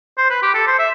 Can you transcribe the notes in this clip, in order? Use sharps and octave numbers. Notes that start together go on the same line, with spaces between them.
C5
B4
G4
A4
C5
E5